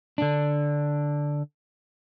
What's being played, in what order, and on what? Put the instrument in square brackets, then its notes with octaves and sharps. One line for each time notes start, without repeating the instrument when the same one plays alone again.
[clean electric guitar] D3 D4